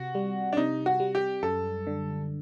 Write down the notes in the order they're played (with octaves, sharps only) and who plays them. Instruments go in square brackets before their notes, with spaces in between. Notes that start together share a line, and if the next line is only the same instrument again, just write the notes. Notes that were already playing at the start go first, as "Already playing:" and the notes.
Already playing: [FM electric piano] C3 [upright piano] F#4
[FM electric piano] G3
[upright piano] D4
[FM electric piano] C3 [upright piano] D#4
[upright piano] F#4
[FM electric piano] G3
[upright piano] G4
[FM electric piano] F#2 [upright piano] A4
[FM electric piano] D3